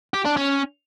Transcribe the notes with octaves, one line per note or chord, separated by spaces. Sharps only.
G4
D4
C#4